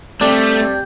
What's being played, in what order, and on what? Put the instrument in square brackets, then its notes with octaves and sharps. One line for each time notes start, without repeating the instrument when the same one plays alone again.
[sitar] G3 [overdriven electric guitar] A3 [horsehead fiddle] C4 [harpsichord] D4 C6